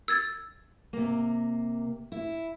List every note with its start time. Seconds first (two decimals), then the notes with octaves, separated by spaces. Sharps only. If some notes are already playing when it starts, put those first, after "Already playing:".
0.08 E6 G#6 A6
0.93 C3 A#3
2.12 E4